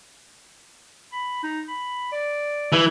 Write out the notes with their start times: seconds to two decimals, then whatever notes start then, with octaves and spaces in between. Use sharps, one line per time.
1.12 B5
1.43 D#4
1.68 B5
2.12 D5
2.72 E3